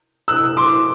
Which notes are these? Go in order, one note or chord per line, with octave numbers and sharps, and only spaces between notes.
E6 F#6
C6 D6